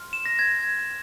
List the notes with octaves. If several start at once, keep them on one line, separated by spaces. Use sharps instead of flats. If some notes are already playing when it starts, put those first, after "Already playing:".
Already playing: C6 F6
E7
A#6
G#6
G#6